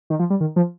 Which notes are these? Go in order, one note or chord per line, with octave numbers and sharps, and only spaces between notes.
D#3
F3
G3
D#3
F3